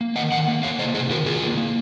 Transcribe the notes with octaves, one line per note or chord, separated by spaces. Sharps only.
A#3
D#3 D#5 F#5
D#3 D#5 F#5
A#3
A#3 C#5 F5
C3 C5 D#5
C3 G#4 C5
D#3 F#4 A#4
C#3 F4 G#4
A#3
A#3